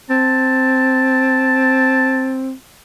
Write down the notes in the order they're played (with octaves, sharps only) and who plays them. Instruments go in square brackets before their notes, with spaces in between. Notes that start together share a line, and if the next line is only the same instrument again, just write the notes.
[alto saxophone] C4 [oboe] A5